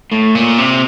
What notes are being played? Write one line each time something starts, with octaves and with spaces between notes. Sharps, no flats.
A2
A#2
C3